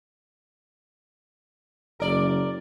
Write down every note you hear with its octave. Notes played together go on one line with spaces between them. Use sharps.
F#1 A#4 D5